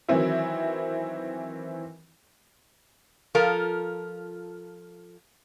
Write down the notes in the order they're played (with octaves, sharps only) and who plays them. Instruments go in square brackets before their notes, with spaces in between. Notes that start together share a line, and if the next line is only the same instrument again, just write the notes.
[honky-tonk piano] D#3 E3 F#3 C4 E4
[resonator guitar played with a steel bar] F3 F4 A4 A#4